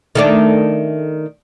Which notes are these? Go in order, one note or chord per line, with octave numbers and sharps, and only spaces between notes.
D#3 A3 D4